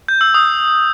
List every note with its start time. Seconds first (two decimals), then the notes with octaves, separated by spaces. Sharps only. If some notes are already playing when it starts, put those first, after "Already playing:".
0.08 G6
0.21 E6
0.34 D#6